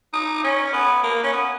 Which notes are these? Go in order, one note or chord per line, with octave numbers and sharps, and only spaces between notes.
D#4
C#4
B3
A#3
C#4
B3